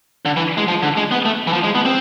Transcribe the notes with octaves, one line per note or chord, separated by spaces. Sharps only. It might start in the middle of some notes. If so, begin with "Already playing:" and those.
D3
E3
G#3
F3
D3
G#3
B3
A3
E3
F3
G#3
B3
C4